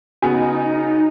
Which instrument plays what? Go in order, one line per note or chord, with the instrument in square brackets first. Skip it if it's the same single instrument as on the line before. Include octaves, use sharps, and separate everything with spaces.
[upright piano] C#3 B3 [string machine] D#4 [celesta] F#4 [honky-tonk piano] G#5